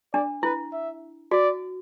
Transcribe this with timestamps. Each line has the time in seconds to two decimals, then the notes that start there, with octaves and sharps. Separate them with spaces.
0.14 D4 D5
0.43 E4 B4
0.73 E5
1.31 F#4 D5